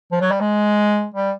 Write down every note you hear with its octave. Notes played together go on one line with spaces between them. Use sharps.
F3
F#3
G3
G#3
G3